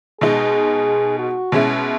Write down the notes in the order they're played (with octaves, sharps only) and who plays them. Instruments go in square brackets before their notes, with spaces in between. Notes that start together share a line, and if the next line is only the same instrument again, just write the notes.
[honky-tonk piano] B2 G#3 D#4 [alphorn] G#4
[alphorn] F#4
[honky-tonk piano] B2 G#3 C#4 E4